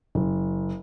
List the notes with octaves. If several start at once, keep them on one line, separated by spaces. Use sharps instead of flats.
F#1